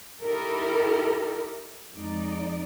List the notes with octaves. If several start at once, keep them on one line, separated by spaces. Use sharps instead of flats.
D#4 E4 G4 A4 A#4
F2 G#3 D#4 D5